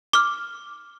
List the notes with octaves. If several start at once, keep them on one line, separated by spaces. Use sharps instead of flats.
D6 F6